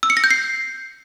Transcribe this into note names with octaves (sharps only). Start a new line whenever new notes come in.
E6
C#7
A#6
G6
C7